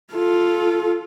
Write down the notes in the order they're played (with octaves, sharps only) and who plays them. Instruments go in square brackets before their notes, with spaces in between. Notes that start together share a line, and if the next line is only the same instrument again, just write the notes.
[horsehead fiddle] F4 A4